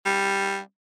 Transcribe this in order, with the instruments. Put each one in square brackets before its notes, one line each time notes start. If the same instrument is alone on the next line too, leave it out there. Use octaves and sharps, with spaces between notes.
[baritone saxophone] G3